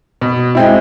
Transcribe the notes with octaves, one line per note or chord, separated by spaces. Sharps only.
B2
G#3 C4 E4